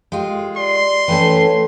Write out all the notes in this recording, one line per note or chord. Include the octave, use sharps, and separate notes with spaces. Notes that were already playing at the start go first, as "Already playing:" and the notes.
G#3 F4 G4 G5
D5 C6
E3 A3 C#4 B4 G5 A5